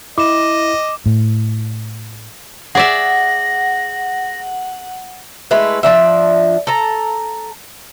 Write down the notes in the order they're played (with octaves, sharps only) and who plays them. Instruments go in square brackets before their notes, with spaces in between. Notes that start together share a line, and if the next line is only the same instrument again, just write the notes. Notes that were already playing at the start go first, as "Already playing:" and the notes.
[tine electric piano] E4 [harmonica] D#5 [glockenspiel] D6 E7
[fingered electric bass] A2
[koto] G#4 D5 E5 [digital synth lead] F#5 [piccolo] A#6
[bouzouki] G#3 A3 E4 B4
F3 D4 E5
A4 A#5